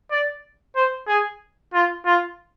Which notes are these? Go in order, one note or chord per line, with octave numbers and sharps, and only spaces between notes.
D5
C5
G#4
F4
F4